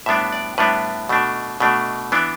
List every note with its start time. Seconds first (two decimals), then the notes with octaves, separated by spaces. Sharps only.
0.06 A2 G3 B3 D4 E5
0.32 D5
0.58 A2 G3 B3 D4 B4
1.09 B2 A3 D4
1.60 B2 A3 D4
2.12 E3 B3 D4